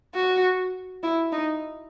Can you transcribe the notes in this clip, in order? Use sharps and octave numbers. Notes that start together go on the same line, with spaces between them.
F#4
E4
D#4